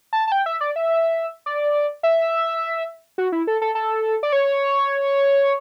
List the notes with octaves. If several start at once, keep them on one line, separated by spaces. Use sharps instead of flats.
A5
A5
G5
E5
D5
E5
D5
E5
F#4
E4
A4
A4
A4
D5
C#5